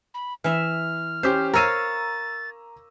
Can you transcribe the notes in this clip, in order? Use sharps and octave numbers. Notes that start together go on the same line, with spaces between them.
B5
E3 E5 F6
C#4 G4 C5
A#4 C#5 F5 A#5 E6 A6 D#7